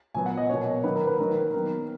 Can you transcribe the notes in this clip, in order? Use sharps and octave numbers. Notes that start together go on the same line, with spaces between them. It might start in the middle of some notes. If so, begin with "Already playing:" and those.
A#2 F#3 B3 G#5
F#5
D#5
B2 F#3 A#3 C#5
D#3 F#3 A#3 B4
A#4
B4
D#3 F#3 A#3 A#4
D#3 F#3 B3 A#4